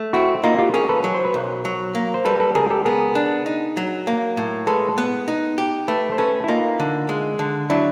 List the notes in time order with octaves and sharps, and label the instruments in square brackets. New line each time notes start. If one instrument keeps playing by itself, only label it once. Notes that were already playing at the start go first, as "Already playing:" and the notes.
Already playing: [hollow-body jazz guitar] A3
[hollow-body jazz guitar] C4 [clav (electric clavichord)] E4 F#4
[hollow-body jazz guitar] A#3 [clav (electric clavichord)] D#4 F4
[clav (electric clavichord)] F4 G4
[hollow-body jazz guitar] C#4 [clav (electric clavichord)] G#4 A#4
[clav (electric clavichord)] A4 B4
[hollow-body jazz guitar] F#3
[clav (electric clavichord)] C5
B4
[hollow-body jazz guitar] B1 [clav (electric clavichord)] A#4 C5
[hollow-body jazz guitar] F#3
A#3
[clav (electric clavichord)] C5
[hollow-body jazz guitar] G3 [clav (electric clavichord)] A4 B4
[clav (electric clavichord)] A4 B4
[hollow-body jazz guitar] C#2 [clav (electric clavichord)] G#4 A#4
[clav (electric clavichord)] G4 A4
[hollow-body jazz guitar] B3 [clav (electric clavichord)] G#4 A#4
[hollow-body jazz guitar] D4
D#4
F#3
A#3
A2
[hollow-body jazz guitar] G#3 [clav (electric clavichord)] A4 B4
[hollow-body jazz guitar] B3
D#4
G4
[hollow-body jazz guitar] A3 [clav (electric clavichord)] A4 B4
[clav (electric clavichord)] C5
[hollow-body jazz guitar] C#4 [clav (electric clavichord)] A4 B4
[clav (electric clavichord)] E4
[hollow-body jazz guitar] A#3 [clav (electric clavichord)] D#4 F4
[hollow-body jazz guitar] D3
G#3
D3
[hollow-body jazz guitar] F#3 [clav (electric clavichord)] D4 E4